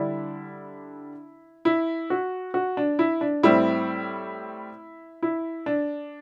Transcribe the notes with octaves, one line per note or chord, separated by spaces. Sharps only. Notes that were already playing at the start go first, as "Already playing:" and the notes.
Already playing: D3 G3 D4 E4
E4
F#4
F#4
D4
E4
D4
A2 G3 C4 E4
E4
D4